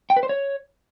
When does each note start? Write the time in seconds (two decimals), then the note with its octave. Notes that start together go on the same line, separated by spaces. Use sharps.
0.10 G5
0.16 B4
0.23 C5
0.29 C#5